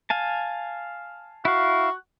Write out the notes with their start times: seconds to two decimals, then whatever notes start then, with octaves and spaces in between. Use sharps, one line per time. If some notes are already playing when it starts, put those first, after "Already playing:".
0.10 F5 G#5 A5
1.45 E4 F#4 F5